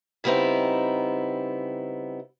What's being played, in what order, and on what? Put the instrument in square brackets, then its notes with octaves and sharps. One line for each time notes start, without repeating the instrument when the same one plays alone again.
[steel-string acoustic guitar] C#3 G3 B3 C4 D#4 E4